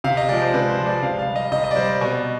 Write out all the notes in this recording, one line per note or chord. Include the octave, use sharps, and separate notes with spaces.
C3 F5
D#5
F3 G#3 D5
C5
C3 B4
C5
F3 G#3
D5
C3 F5
F5
G3
D#5
C3 D#5
D#5
D5
G3 C5
B2